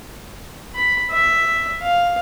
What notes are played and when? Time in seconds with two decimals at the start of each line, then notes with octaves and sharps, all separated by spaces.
0.75 B5
1.11 E5
1.82 F5